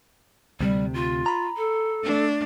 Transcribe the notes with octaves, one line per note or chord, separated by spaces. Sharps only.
D2 C3 G3
F4
A#5 B5
A4
A3 D4